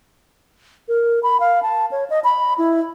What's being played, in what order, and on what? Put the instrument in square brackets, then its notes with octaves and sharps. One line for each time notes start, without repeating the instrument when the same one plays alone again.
[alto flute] A#4
B5
F5
A5
C#5
D#5
B5
E4